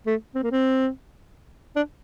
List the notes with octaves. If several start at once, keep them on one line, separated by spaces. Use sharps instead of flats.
A3
C4
A#3
C4
D4